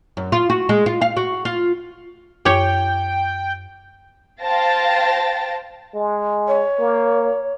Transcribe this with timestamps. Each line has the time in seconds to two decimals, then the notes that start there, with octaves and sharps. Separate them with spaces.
0.17 F#2
0.32 F4
0.50 F#4
0.69 G#3
0.86 F4
1.01 F5
1.17 F#4
1.45 F4
2.45 F#2 G4 C#5 G5
4.43 C5 F5 G5 A5 A6 A#6
5.95 G#3
6.48 C#5
6.79 A#3